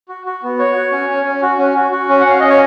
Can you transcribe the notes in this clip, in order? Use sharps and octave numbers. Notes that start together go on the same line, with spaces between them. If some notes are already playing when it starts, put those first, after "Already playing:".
F#4
F#4
B3
F#4 C#5
F#4
C#4
C#4
C#4
F#4
C#4
F#4
F#4
C#4
F#5
C#4 F5
C#4 D#5
C#5